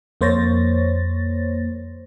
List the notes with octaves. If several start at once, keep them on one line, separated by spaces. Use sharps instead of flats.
F2 A#3 C5 C#5 A6 A#6